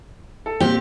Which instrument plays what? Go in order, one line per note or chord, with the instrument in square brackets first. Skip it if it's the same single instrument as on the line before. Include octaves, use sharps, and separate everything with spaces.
[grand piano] A4
[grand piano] A#2 C4 [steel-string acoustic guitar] G4